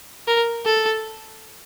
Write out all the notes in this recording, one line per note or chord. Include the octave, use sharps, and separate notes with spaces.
A#4
A4